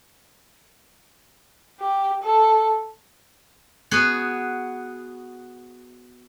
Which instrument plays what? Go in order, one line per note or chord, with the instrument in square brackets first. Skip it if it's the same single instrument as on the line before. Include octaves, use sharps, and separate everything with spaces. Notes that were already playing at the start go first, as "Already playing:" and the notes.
[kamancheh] G4
A4
[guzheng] B3 F#4 G#4